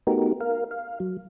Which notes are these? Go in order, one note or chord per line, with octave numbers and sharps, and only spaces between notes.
A3 B3 D#4 F#4 G4 A#4
A#4 F5
F5
F#3